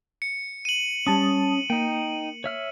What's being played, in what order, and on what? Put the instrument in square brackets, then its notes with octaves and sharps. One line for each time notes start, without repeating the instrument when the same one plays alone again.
[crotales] C#7
D#7 F#7
[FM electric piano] G3 A5 D#6 [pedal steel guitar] C#4
[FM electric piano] A#3 [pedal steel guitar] D#4 G5
[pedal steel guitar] C#5 E5 F6